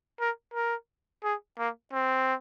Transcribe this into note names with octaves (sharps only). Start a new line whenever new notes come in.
A#4
A#4
G#4
A#3
C4